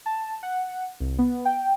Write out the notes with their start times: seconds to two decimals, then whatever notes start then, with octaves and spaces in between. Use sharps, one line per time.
0.06 A5
0.43 F#5
1.00 C2
1.18 B3
1.45 G5